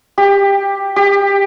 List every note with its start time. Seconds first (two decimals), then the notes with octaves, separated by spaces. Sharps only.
0.18 G4
0.96 G4